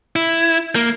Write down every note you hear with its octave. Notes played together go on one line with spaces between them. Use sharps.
E4
A#3